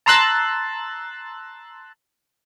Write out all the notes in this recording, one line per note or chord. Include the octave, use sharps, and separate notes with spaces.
A5 A#5 C6 E6 F#6 A6